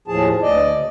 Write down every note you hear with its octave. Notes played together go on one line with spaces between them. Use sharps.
D#2 A2 F3 G#4 A5
D2 D5 D#5
C#3